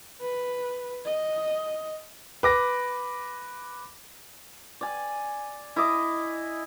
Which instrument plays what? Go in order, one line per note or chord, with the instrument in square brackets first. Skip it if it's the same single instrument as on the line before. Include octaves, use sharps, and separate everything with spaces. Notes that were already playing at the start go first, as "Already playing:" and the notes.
[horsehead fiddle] B4
D#5
[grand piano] B4 D6 A#6
[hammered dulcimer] D5 G#5
E4 D#5 D6